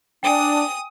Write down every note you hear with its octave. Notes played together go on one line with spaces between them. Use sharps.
D4 G5 G#5 D#6